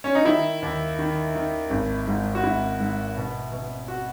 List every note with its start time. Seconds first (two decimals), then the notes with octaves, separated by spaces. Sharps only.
0.04 C#4
0.15 D#4
0.25 D#3 E4
0.62 D#2
0.99 D#3
1.35 D#3
1.70 G#1
2.07 G#2
2.35 F#4
2.43 G#1 E4
2.80 G#2
3.17 B2
3.52 B2
3.88 F#4